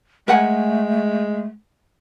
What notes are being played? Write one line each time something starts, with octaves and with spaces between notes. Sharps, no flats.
G#3 A3 A#4 F#5 G#5